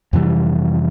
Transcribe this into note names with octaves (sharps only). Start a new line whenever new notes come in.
F2 C3 E3 G3